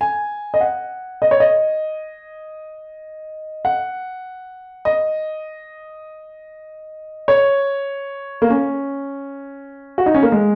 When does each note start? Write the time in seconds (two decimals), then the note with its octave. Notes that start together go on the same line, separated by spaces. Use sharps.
0.01 G#5
0.54 D#5
0.61 F#5
1.22 D#5
1.31 C#5
1.40 D#5
3.65 F#5
4.85 D#5
7.28 C#5
8.42 A#3
8.50 C#4
9.98 F#4
10.06 D#4
10.14 C#4
10.23 A#3
10.32 G#3